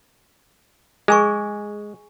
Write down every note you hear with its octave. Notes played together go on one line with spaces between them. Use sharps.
G#3 G#4 G#5 C#6